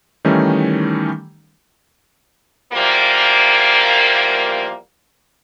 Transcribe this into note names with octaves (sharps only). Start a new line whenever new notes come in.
D#3 E3 G3 A3 C#4 D#4
E2 F3 G3 A#3